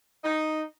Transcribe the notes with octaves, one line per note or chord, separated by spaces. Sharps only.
D#4